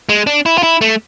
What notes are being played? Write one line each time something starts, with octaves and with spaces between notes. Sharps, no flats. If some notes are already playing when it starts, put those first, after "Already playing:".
G#3
D4
E4
F4
E4
A3